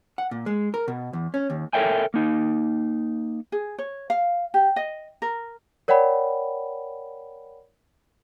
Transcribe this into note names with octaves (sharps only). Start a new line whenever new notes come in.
F#5
A#2
G#3
A#4
B2
E2
C#4
D#2
A4 A#4 C#5 E5 G5 G#5
A#3 D#4
G#4
C#5
F5
G4
D#5
A#4
A#4 C#5 D5 F#5 G5 B5